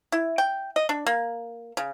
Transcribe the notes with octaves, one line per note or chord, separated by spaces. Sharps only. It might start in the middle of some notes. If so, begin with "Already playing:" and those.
E4
G5
D#5
D4
A#3
C#3